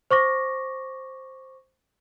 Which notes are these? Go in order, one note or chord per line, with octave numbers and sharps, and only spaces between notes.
C5 C#6 D6 A#6